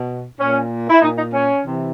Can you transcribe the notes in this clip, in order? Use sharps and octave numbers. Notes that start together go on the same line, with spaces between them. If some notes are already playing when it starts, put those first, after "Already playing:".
Already playing: B2
A#2 C#4
E4
A#2 D#4
D#4
C#4
C3 E3